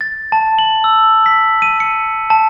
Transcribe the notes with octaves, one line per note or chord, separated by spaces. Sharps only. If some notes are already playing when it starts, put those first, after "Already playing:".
A6
A5
F#7
E6
B6
D#7
C#7
A5